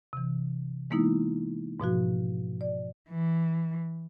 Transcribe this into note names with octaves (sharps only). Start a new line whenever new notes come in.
C3 E3
E3 G#3 A#3 B3 D#4 E4
G#2 B2 F3 F#4
D5
E3